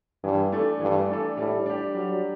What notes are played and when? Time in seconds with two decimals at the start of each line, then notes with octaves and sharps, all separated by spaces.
0.24 G2 E3
0.52 A3 D4 A4
0.81 G2 E3
1.10 A3 D4 A4
1.37 A2 G3
1.66 D4 G4
1.94 F#3 G3